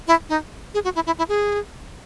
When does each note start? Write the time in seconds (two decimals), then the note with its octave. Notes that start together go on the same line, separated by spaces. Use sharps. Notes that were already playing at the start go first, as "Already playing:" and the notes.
0.07 E4
0.29 D#4
0.74 G#4
0.84 F#4
0.95 E4
1.06 E4
1.18 E4
1.29 G#4